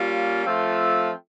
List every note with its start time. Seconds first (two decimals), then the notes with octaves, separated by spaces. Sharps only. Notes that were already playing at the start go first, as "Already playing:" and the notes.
Already playing: G3 A#3 C#4 F4
0.44 F3 A3 C4 F4 A4